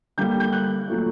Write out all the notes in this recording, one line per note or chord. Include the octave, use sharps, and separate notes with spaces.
D3 G3 A#3 G6
G6
F#6
A#2 F#3 A3